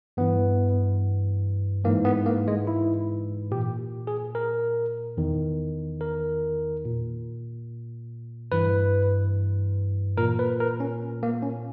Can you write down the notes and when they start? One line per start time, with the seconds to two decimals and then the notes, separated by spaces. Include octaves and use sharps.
0.17 G2 E3 B3
1.84 G#2 E3 A#3
2.05 B3
2.26 A#3
2.48 G#3
2.67 E4
3.51 A#2 G4
4.07 G#4
4.35 A#4
5.17 E2 D#3
6.01 A#4
6.85 A#2
8.52 G2 E3 B4
10.17 A#2 A#4
10.39 B4
10.60 A#4
10.80 C#4
11.23 A#3
11.43 C#4